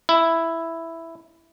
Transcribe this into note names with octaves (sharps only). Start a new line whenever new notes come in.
E4